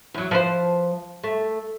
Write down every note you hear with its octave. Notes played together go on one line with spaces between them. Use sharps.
E2 F#3
F3 B4 C5
A3